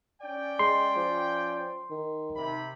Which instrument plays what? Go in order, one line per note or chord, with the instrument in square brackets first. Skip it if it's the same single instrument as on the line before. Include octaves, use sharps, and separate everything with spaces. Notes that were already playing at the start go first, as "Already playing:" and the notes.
[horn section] C#4 D5 G5
[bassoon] G#3 [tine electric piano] C6
[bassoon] F3
D#3
[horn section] C3 B5